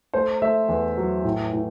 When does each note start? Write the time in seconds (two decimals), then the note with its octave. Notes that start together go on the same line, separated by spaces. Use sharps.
0.14 A3 C5
0.42 A3 E5
0.69 E2
0.98 F#3
1.24 A2
1.53 A2